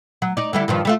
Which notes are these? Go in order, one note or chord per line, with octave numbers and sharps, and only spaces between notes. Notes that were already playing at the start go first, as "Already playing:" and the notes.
F#3
D#4 D5
D3 G3 E4
G2 D#3 F3
G3 A3 F4